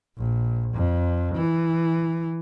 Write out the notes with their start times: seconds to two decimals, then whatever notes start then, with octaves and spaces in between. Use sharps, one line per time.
0.17 A#1
0.74 F2
1.35 E3